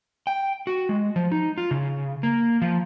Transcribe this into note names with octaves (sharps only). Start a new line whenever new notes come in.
G5
F#4
G#3
F3
D#4
F4
C#3
A#3
F3